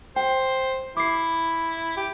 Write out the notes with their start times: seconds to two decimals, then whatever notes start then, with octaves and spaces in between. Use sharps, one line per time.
0.16 C5 G5
0.97 E4 D6 C7
1.97 G4